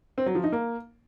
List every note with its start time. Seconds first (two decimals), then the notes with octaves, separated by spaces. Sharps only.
0.18 C4
0.26 F#3
0.35 F3
0.44 D#4
0.52 A#3